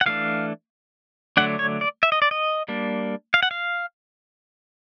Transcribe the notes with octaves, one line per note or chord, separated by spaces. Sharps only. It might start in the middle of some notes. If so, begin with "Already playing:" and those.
F#5
E3 A3 D4 F5
D3 F#3 A3 D4 F#5
C#5
D5
E5
D#5
D5
D#5
G3 A#3 D4
F5
F#5
F5